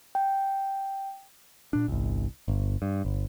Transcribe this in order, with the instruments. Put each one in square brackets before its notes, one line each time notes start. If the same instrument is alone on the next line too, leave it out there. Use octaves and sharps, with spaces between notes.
[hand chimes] G5
[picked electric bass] A#2 D4
G1 C2
G1
G2
G1